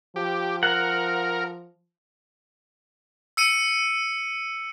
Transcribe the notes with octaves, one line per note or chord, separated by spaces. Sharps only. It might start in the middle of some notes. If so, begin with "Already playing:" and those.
F3 G4
A#4 F#5
E6 C#7 D#7